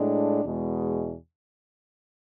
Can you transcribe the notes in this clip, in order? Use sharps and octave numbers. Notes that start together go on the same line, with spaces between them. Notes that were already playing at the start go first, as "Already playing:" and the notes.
Already playing: A2 G#3 D4
E2 B2 G#3